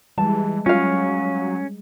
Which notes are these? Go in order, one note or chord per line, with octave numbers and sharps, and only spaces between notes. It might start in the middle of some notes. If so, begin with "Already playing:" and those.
E3 G3 G#3 A5
F#3 C#4 F4 F5